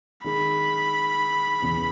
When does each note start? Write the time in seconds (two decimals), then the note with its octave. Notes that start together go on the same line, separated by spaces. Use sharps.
0.24 D#3 G#3 D#4 G#4 B5
1.62 E2 C#3 E3